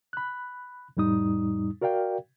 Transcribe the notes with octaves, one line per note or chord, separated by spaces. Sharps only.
B5 F#6
F2 A2 G3 D#4 D#6
F#4 A#4 D5 F5 G5